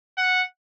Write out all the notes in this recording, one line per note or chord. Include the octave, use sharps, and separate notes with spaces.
F#5